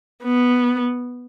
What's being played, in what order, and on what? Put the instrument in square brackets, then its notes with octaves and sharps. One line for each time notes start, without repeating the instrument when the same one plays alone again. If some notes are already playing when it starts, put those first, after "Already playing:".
[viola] B3